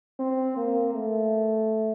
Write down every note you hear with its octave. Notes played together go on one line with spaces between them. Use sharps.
C4
A#3
A3